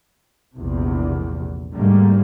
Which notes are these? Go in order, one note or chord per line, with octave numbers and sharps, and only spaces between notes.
A#1 E2 C3
G#2 D3 G3 A3 A#3